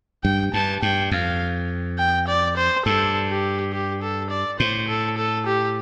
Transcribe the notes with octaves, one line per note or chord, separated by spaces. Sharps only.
G2 G5
G2 A5
G2 G5
F2 F5
G5
D5
C5
G2 A4
G4
G4
A4
D5
A2 C5
A4
A4
G4